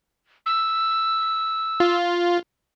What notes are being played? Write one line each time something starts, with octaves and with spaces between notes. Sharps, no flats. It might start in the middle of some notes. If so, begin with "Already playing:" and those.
E6
F4